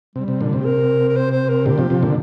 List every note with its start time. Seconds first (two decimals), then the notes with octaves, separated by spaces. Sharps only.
0.16 C3 G3
0.28 C3
0.41 A#2 D3
0.53 C3
0.61 G4
0.65 A#4
1.08 A#4
1.16 C5
1.32 C5
1.49 A#4
1.66 A#2 D3 G4
1.78 C3 F3
1.90 C3 F3
2.03 A#2 D3